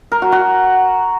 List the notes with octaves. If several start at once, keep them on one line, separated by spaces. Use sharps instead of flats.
A#4
F#4
F#4